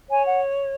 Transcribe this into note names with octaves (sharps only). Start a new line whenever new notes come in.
C#5 G#5
F#5